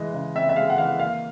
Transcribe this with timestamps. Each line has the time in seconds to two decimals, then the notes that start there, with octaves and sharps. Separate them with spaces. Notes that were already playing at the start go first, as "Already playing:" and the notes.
Already playing: E3 G#3 D#5
0.14 C#3
0.35 C4 E5
0.49 E5
0.56 G#3 F5
0.70 F#5
0.78 E3 F5
0.98 A#3 F5